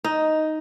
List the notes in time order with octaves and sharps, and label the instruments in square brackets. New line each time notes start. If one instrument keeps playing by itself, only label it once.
[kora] D#4